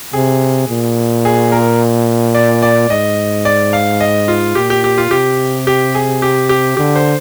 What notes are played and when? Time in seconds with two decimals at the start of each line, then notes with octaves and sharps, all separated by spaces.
0.13 C3 G#4
0.69 A#2
1.25 G#4
1.52 A#4
2.35 D5
2.62 D5
2.90 G#2 D#5
3.45 D5
3.73 F5
4.01 D#5
4.28 F4
4.55 A#2 G4
4.70 G4
4.84 G4
4.98 F4
5.11 C3 G4
5.67 G4
5.95 G#4
6.22 G4
6.49 G4
6.77 D3 G4
6.96 C5